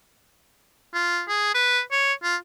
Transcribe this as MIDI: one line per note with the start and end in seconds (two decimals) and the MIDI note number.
0.94 1.23 65
1.29 1.52 68
1.54 1.81 71
1.91 2.13 73
2.23 2.36 65